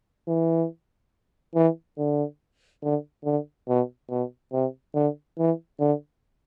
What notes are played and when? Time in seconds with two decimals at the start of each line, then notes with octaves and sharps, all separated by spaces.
0.28 E3
1.55 E3
1.98 D3
2.83 D3
3.25 D3
3.68 B2
4.10 B2
4.53 C3
4.95 D3
5.38 E3
5.80 D3